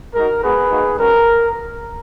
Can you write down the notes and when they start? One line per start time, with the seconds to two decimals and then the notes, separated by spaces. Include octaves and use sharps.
0.14 G#3 D#4 F#4 A#4
0.43 G#3 B3 F#4 G#4 B4
0.70 A#3 D#4 F#4
0.99 G#3 C#4 F#4 A#4